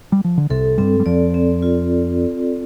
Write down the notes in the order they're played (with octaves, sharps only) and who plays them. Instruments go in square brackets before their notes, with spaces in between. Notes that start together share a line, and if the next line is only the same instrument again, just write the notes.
[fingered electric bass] G3
F3
D3
[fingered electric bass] C2 C3 [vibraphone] A4
[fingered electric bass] G2 G3 [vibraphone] C4
[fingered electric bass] G3
[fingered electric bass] F2 F3 [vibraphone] D5
[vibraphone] C4
F4